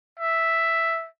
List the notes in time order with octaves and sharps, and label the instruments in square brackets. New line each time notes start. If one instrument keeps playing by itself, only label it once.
[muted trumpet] E5